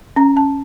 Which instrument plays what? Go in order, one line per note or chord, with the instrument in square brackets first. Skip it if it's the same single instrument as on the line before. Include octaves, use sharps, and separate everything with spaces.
[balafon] C#4 A#5
C#4 A5